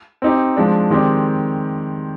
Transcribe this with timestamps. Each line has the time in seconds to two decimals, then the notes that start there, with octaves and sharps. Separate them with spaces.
0.22 C4 D#4 G4
0.57 F3 G#3 D4
0.90 D#3 G#3 C4 G4 D5